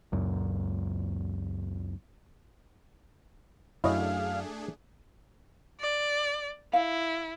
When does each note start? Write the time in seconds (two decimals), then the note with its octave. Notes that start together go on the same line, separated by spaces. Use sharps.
0.12 C#2 F#2 A#2
3.84 F#2 A3 D4 E4 G#4 C#5 D#5 F5
5.80 D5
6.73 E4 F5